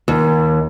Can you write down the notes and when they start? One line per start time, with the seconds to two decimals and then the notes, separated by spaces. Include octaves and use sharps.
0.08 D#2